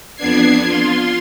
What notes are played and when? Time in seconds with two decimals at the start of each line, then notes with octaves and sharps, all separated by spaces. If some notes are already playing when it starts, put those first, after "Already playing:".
0.16 F2 B3 D4 G#6 C7
0.65 F4 C6